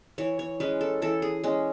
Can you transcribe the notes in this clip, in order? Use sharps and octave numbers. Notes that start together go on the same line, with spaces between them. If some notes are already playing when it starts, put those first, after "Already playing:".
E3 C#5
C#5
G#3 C#4 B4
A4
E3 A4
G#4
G#3 C#4